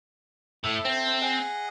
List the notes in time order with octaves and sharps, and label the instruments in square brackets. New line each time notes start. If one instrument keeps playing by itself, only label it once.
[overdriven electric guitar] A2 [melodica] A4 E5
[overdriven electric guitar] C4
[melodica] G#4 D#5 F#5